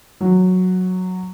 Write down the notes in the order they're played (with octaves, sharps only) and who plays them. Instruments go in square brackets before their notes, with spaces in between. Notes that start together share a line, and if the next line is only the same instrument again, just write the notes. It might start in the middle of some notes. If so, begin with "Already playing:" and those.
[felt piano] F#3